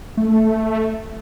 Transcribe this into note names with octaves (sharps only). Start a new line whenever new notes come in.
A3